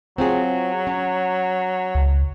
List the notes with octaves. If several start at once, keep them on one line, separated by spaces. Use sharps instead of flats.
F#3 C4 F4 G#4
C#4
C#2